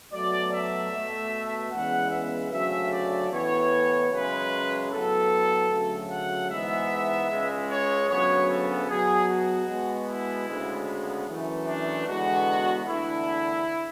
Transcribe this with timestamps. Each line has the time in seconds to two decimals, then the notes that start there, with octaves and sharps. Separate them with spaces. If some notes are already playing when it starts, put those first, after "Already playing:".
0.12 B2 F#3 A3 D5
0.52 E5
0.91 B2
0.97 A3
1.71 E2 C#3 G#3 B3 F#5
2.11 E5
2.50 D2 C#3 F#3 A3 E5
2.90 D5
3.30 A2 E3 B3 C#5
4.10 F#2 C#3 G#3 B4
4.90 A2 F#3 B3 A4
5.69 D2 C#3 F#3 A3
6.09 F#5
6.49 G#2 E3 G#3 B3 E5
7.28 C#2 C#3 G#3
7.68 C#5
8.08 D2 C#3 F#3 B3 C#5
8.48 A4
8.88 B2 F#3 B3 G#4
9.28 F#4
9.67 B2 G#3 B3
10.08 E4
10.46 D2 C#3 G#3 B3
11.27 F#2 E3 A3
11.67 D4
12.06 E2 D3 G#3 B3 F#4
12.85 E2 D3 A3 E4